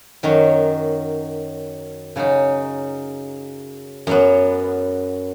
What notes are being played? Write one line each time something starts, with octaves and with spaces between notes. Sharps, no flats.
F#2 D#3 F#3
C#3 F#3 D#4
F#2 F#3 B3